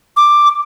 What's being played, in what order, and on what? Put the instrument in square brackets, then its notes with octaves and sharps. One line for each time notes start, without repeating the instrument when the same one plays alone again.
[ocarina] D6